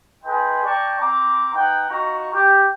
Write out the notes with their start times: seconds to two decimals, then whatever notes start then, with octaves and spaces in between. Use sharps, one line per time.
0.24 D#4 G#4 B4 G5 C6
0.64 D5 G5 A5 A#5 C#6
1.00 C4 A#5 D6
1.53 B3 D#4 F#5 G5
1.89 D#4 F4 F#4 A#5 C#6
2.32 G4